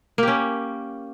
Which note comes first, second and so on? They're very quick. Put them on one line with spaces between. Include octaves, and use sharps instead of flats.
A#3 G4 C#4